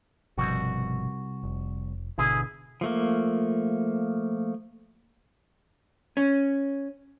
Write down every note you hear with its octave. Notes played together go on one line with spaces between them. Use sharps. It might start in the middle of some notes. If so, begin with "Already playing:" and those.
G1 C2 B2 F3 F#4
F1
G#1 B2 D3 E4 G#4
F3 A3 A#3
C#4